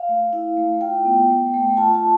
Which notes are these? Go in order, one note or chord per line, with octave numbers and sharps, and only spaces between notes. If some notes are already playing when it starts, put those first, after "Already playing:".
Already playing: F5
A3
E4
A3
F4 G5
B3
A3
A3
F4 A5
A5